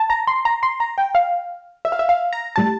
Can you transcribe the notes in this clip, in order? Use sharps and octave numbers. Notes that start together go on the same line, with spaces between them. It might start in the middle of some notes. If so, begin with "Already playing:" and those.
Already playing: A5
A#5
C6
A#5
C6
A#5
G5
F5
E5
F5
E5
F5
A#5
A2 G3 A5